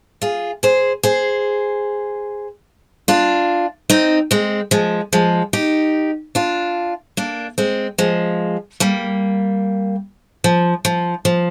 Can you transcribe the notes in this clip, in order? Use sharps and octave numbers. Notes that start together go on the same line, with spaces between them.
F4 G#4
G#4 C5
G#4 C5
D4 F4
C4 D#4
G#3 C4
F3 G#3
F3 G#3
D#4 G4
D4 F4
A#3 D4
G#3 C4
F3 G#3
G3 A#3
F3
F3
F3